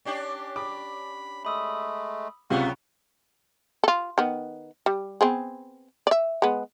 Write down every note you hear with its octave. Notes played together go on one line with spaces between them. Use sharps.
C#4 D4 G4
B5 D6
G#3 A3 B5 D#6 E6
C#2 C3 F#3 G3 B3 F4 F#5 C#6
F4 A4
D#3 B3
G3
B3 C4 G#4
D5 E5
G#3 B3